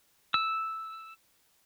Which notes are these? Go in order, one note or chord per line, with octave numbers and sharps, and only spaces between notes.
E6